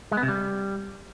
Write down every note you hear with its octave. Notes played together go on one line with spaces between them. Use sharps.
G#3
B3
C3
G3